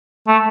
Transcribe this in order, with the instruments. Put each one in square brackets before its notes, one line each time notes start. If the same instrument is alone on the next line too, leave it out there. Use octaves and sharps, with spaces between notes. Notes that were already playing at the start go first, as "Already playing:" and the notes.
[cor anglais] A3